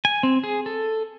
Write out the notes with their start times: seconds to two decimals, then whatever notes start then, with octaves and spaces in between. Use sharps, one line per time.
0.05 G#5
0.23 C4
0.44 G#4
0.66 A4